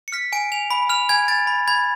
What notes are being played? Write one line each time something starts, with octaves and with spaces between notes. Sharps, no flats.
C#7
F6 B6
G#5 D7
G#5 F7
B5
F6 F7
G#5 G#6
G#5 A6
B5
B5 G#6